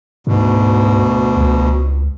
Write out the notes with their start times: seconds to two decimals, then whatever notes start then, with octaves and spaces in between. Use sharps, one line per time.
0.27 D2 G#2 B2
1.37 C#2